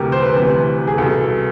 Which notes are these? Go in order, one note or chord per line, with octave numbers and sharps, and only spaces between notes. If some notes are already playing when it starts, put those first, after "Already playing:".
Already playing: D2 C3 E3 G4 A#4
C5
B4
D2 C3 E3
G#4
C2 B2 A4